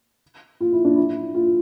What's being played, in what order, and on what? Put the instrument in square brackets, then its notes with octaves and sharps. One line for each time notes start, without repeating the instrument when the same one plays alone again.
[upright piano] F4
E4
D4
E4
F4